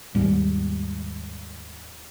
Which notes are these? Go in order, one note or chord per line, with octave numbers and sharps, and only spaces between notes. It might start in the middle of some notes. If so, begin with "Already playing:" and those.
D#2 G#2 G3